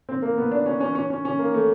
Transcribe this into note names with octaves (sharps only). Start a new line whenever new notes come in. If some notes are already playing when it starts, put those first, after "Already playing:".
C4
A#3
B3
D4
C#4
C#4
C#4
C#4
C#4
A#3
A3